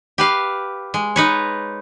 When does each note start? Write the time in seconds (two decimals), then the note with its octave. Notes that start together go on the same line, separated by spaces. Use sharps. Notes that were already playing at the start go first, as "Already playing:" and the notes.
0.18 G4 B4 F5
0.94 G#3
1.16 D#4 B4 C#5